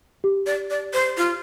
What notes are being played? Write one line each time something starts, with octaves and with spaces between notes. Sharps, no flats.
G4
D5
D5
C5
F4